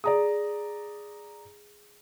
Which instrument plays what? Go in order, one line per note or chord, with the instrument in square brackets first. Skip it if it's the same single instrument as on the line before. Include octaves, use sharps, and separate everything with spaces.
[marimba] G#4 [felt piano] D5 A#5 D#6